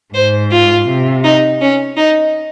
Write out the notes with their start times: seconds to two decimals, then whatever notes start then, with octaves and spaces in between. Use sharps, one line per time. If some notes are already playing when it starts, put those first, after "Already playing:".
0.14 G#2 C5
0.51 F4
0.87 C3
1.24 D#4
1.61 C#4
1.97 D#4